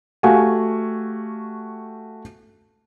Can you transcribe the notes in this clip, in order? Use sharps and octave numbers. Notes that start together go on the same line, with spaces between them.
A3 F#4 G4 F5 G#5